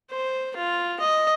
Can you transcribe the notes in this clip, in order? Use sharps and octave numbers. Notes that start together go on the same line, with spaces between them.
C5
F4
D#5